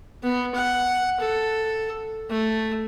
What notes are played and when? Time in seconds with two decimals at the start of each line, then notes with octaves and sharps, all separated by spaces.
0.23 B3
0.55 F#5
1.20 A4
2.30 A3